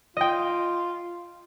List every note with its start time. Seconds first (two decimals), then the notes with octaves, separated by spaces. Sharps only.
0.17 F4 D#5 G5